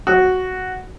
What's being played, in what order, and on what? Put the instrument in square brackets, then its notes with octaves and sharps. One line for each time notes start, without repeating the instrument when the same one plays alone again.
[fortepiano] F#4